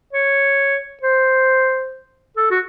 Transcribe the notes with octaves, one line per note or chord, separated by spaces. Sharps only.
C#5
C5
A4
F#4